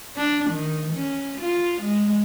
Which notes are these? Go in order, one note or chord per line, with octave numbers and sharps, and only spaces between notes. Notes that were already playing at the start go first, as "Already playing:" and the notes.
D4
D#3
C#4
F4
G#3